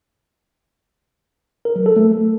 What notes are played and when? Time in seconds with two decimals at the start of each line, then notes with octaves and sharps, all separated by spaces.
1.65 A#4
1.76 F#3
1.86 A4
1.96 A3